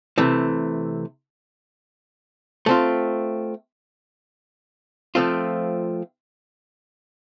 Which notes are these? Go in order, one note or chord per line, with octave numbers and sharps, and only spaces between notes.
C3 E3 A3
A3 C4 F4
F3 A3 C4 F4